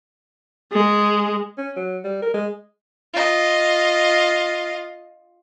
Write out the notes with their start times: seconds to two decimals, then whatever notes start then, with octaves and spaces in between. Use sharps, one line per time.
0.72 G#3
1.58 C#4
1.76 F#3
2.04 G3
2.22 A#4
2.34 G#3
3.14 F4 D#5